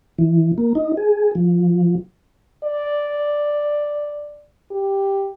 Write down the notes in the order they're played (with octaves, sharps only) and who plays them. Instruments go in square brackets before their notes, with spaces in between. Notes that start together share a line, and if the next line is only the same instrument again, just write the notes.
[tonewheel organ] E3
A#3
D#4
G#4
F3
[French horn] D5
G4